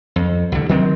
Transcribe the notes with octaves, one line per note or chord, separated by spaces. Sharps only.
F2
C2 D3
D#3 F#3 C4